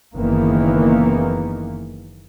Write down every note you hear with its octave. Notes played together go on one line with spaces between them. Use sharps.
F#1 D#3 E3 A#3 B3